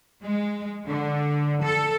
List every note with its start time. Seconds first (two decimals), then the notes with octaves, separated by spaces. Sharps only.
0.22 G#3
0.87 D3
1.63 A4